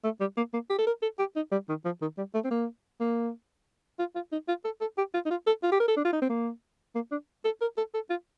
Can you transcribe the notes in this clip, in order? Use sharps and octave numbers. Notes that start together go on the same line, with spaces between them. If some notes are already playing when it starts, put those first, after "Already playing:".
A3
G3
A#3
A#3
G4
A4
A#4
A4
G4
D#4
G3
D#3
F3
D#3
G3
A3
C4
A#3
A#3
F4
F4
D#4
F4
A4
A4
G4
F4
D#4
F4
A4
F4
G4
A#4
A4
D4
F4
D#4
C4
A#3
A#3
D4
A4
A#4
A4
A4
F4